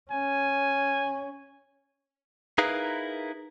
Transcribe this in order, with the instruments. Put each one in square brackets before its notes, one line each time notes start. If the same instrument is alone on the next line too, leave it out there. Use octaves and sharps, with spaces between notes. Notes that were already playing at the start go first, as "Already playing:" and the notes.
[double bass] C#4 [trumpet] G#5
[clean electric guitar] D#4 E4 G#4 A#4 B4 F5